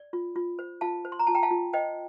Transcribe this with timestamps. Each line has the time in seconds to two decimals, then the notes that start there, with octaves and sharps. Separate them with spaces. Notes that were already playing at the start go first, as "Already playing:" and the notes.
Already playing: D5
0.13 F4
0.36 F4
0.59 C5
0.81 F4 F5 A5
1.05 C5
1.12 C6
1.19 A#5
1.27 F4 A5
1.34 G5 A#5
1.43 F5 A5
1.51 F4
1.73 C5 D#5 G5